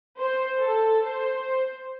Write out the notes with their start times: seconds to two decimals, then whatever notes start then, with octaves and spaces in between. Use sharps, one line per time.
0.19 C5
0.60 A4
1.04 C5